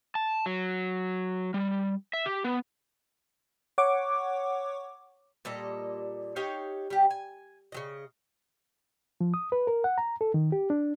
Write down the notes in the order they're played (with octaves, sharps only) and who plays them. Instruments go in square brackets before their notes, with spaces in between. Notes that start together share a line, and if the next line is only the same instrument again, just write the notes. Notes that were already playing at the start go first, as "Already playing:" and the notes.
[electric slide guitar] A5
F#3
G3
E5
G4
B3
[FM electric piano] C#5 F#5 C#6 D6
[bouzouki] A#2 G3 A4 D#5
D#4 G4 C#5 F5
G3 G4
G#5
C#3 F#3 D#5
[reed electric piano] F3
D#6
B4
A#4
F#5
A#5
A4
D#3
G4
D4